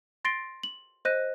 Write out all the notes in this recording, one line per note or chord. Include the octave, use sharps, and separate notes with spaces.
C6 A6 A#6 C7 D7 G7
F#7
C5 D#5 F#6 A#6 D#7